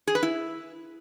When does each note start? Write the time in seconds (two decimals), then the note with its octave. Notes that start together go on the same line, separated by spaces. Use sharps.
0.07 G#4
0.15 B4
0.23 E4